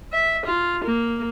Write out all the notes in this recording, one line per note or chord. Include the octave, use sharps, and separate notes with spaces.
E5
F4
A#3